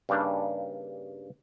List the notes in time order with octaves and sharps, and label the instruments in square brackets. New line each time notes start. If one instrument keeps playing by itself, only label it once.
[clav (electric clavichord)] G2 C#3 G3 A#3 D4 D#4